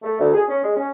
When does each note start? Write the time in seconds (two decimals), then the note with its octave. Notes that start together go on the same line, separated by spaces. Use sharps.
0.03 A3
0.20 D2
0.34 G#4
0.48 C#4
0.63 G#3
0.76 C#4